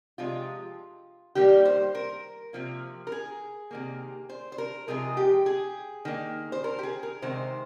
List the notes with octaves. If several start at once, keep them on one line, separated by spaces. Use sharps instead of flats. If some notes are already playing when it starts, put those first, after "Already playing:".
C3 F3 G#3 F4
D#3 G3 A#3 G4
C5
A#4
C3 F3 A#3
A#4
G#4
C3 D#3 A#3
C5
C5
A#4
C3 F3 G#3 G#4
G4
G#4
D#3 A#3
C5
A#4
G4
G#4
A#4
C3 D#3 G#3 C5